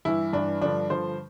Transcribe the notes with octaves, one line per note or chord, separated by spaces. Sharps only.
G2 E3 E4
G2 E3 D4
G2 D3 F3 D4
G2 D3 F3 C5